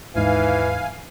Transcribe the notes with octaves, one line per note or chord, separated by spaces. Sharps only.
D#2 G#2 E3 D#4 F5 G#5